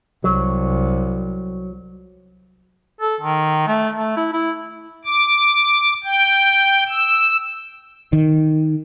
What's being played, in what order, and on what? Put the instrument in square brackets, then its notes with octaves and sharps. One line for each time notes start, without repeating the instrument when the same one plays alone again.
[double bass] C2 [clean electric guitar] F#3
[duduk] A4
D#3
A3
A3
E4
E4
[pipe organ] D6
G5
E6
[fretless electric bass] D#3